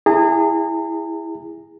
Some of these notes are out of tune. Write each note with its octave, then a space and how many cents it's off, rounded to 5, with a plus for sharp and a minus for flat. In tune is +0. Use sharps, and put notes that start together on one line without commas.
E4 +0 G#4 -25 A#5 -45